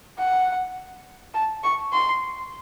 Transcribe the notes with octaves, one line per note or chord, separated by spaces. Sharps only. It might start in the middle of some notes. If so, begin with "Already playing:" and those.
F#5
A5
C#6
C6